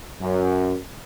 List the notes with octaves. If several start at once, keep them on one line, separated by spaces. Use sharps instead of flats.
F#2